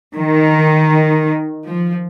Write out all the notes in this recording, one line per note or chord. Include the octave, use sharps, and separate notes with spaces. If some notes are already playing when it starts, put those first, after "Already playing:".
D#3
F3